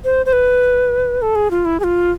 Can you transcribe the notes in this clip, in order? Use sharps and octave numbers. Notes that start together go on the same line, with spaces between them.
C5
C5
B4
A4
G#4
F4
E4
G#4
F4